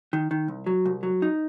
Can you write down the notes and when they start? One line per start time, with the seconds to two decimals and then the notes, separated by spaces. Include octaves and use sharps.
0.13 D#3
0.31 D#3
0.48 C2
0.66 F#3
0.86 C2
1.03 F#3
1.22 D#4